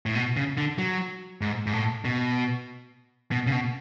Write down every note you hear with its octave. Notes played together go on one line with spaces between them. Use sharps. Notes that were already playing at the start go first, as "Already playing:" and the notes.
A2
B2
C#3
D3
F#3
G#2
G#2
A2
B2
B2
C#3
B2